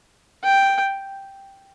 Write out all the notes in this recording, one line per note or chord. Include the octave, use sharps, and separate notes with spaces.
G5